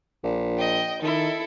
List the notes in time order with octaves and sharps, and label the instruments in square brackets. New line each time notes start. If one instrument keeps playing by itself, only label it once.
[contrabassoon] A#1
[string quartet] D#5 G5
[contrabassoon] D#3 [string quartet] E4 A4